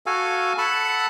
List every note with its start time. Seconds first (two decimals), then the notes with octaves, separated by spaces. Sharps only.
0.06 F#4 A4 F5 G#5
0.58 A4 F#5 A5 B5